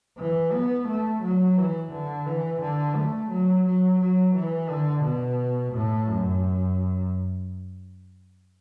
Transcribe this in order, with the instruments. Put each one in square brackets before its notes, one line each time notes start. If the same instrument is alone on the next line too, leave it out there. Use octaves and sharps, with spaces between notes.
[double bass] E3
B3
A3
F#3
E3
D3
E3
D3
A3
F#3
F#3
F#3
E3
D3
B2
A2
F#2